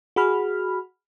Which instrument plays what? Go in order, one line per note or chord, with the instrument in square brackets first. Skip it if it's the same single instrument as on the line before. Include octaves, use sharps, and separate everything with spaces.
[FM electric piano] F#4 G#4 B5 F6